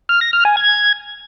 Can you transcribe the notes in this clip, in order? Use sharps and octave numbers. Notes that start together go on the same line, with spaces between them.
F6
A#6
F6
G#5
G#6